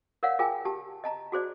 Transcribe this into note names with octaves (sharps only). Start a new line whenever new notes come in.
A#4 C#5 D5 F5 F#5
F4 G#4 A#4 G5 G#5
G4 A5
D#5 A5 A#5
F#4 G#4 C5 D5